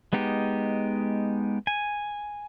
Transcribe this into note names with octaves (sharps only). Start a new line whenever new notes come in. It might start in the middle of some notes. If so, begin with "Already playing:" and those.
G#3 B3 D#4 G4
G#5